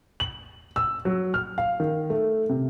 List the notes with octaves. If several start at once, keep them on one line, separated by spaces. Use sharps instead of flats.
F#7
E6
F#3
F6
F5
D#3
A3
C3